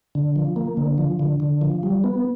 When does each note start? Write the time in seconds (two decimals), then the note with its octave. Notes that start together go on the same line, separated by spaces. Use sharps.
0.15 D3
0.36 F3
0.56 A#3
0.77 D3
0.98 F3
1.19 D3
1.40 D3
1.61 F3
1.83 G3
2.04 B3